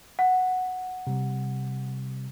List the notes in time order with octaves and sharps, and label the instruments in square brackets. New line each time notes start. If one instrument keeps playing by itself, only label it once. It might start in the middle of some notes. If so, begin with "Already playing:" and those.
[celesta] F#5
[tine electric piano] C3 G3